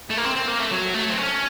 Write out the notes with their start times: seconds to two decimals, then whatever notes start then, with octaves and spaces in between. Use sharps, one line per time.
0.10 A3
0.17 A#3
0.24 C4
0.36 C4
0.48 A#3
0.59 A3
0.71 F#3
0.94 A3
1.10 C4
1.17 C#4